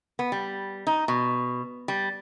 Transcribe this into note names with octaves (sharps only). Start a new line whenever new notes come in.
B3
G3
D#4
B2
G3